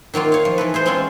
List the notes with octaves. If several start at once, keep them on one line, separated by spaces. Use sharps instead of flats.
D#3 F#3 A#3 F4
C#5 F5
F3
E3 A4 B4
G#4 A4 C5
G#3 C4 C#4 F4 G#4